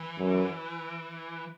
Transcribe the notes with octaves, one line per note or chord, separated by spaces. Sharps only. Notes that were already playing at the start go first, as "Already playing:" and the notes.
Already playing: E3
F#2